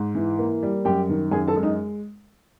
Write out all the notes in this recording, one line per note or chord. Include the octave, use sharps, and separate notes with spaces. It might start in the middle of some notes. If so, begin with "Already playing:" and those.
Already playing: G#2
E3
A#3
G3
F#2 G4 G5
D#3
F#2 G#4 G#5
A4 A5
G#3
D#4 D#5